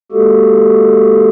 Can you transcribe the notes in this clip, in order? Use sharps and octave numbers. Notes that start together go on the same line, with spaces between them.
G#3 A#3 F#4 G4 A4